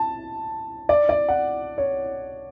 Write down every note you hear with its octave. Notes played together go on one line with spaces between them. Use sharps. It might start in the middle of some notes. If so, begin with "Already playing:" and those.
Already playing: A5
D5
D5
F#5
C#5